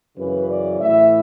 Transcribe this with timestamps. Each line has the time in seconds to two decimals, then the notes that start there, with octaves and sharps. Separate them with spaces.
0.18 F#2 C#3 E3 B4
0.50 D5
0.80 A2 E3 E5